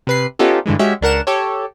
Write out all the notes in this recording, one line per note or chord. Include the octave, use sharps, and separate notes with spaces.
C3 B4 C7
B3 C#4 D#4 F4 G4 A4
G2 D3 E3 G#3
G#3 C#4 F#4 G4 E5
C#2 D4 A#4 F#5 E7
G4 A4 C#5